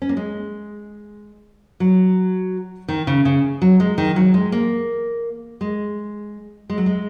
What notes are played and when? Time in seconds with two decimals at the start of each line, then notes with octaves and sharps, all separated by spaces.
0.02 C#4
0.09 A#3
0.17 G#3
1.80 F#3
2.88 D#3
3.07 C#3
3.25 C#3
3.62 F#3
3.80 G#3
3.98 D#3
4.16 F#3
4.34 G#3
4.52 A#3
5.61 G#3
6.70 G#3
6.77 F#3
6.86 G#3